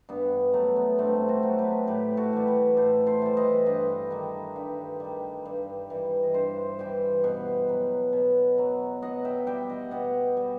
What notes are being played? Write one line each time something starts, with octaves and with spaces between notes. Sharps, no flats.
G2 B3
F#3 A3
B3
G2 A3 C4
F#4 A4
F#3
G4 B4
A2 G4 B4
F#4 A4
E3 G3
G4 B4
A2 A4 C5
A4 C5
E3 G3
B4 D#5
G2 B4 D#5
D#3 G3
G2
D#3 G3
G2
E3 G3
D#5
G2 C5 E5
E3 G3 E5 G5
B2
F#3
B2
F#3
B2 D#5 F#5
E5 G5
G3 E5 G5
D#5 F#5
B2 D#5 F#5
G3